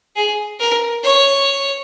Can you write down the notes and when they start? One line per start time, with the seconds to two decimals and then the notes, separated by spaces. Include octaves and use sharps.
0.16 G#4
0.60 A#4
1.04 C#5